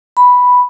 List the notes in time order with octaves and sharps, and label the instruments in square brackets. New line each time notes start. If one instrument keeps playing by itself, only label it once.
[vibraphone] B5